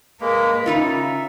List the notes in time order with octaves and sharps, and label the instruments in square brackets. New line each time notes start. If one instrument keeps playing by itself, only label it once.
[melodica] G#3 A#3 [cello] A#4 B4
[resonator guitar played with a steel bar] C#3 D#4 F4 [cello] C#4 [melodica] E5